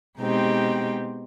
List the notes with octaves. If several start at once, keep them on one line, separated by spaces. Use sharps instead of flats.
B2 G#3 C4 D#4 G4